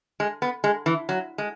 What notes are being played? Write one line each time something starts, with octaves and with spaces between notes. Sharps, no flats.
G#3
B3
G#3
E3
F#3
G#3